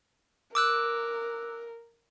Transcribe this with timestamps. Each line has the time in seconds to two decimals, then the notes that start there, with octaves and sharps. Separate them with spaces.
0.55 A#4 D6 E6 F#6